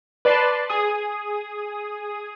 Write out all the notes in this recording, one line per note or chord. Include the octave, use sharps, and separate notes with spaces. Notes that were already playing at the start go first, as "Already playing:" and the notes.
B4 D5 A5 C6
G#4 D#6